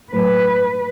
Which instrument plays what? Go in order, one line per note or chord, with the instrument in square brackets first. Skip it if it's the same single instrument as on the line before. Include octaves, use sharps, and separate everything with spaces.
[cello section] A2 F#3 B4